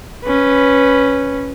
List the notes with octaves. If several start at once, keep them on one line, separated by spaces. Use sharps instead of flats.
C#4 B4